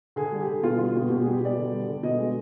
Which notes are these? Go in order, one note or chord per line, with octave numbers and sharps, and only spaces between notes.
D3 G#4
G3
G4
D3
B2 F4
G3 F4
B2
B2 G4
G3 G#4
G4
B2 D5
D3
G3
D3
B2 D#5
G#3